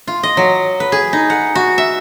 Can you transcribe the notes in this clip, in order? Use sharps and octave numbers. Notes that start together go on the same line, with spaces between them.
F4
D#5
F#3
B4
G#4
D#4
F#5
F#4
E5